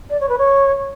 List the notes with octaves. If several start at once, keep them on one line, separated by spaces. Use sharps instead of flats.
D5
C#5
B4
C#5